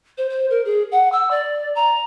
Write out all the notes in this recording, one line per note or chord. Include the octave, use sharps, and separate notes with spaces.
C5
C5
A#4
G#4
F#5
E6
D5
A#5